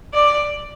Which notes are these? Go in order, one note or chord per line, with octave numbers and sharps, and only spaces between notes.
D5